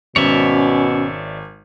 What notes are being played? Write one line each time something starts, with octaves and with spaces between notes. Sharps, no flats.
G#1 B2 C#4 C#5 D5 E5